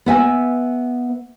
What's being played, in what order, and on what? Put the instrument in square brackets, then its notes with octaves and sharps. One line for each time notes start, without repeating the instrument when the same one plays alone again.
[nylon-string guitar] B3 E5 G#5